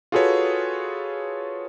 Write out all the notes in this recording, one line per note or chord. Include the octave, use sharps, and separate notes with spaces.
F4 F#4 G#4 A4 B4 C#5